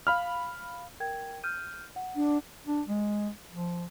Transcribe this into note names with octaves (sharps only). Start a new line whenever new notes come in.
F5 B5 F6
A#4 G5 G#6
F6 G6 D#7
F#5
D4
D4
G#3
F3